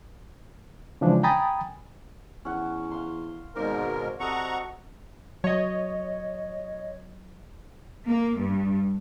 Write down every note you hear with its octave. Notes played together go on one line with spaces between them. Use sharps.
C#3 E3 F3 G#3 D4
G5 G#5 A#5 B5 D#6 A6
E2 C#4 F#5
F5 C6
G#1 G#2 B2 A#4 C5 D5 F5
C3 F#3 A4 D#5 F#5 A#5 C#6
F#3 C#5 D#5
A#3
G2